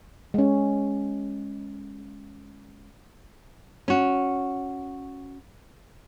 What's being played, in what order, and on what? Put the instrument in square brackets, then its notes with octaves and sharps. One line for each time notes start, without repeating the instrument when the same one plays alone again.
[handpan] G#3 C#4
[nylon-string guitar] C#4 F#4